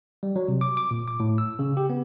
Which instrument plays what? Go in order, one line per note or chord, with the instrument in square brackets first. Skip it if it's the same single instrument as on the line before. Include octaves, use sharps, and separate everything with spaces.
[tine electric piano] G3
F#3
C3
D6
D6
A#2
D6
A2
E6
C#3
G4
B3